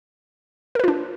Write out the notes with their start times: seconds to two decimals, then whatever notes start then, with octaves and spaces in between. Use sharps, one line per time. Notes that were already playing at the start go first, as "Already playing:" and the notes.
0.75 A#4
0.79 B4
0.84 F4
0.88 D4